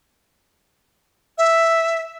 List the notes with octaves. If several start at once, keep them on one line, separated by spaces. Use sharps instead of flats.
E5